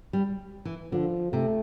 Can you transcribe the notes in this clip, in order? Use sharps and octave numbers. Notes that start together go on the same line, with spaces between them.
G3
E3
D3 F3
C3 A3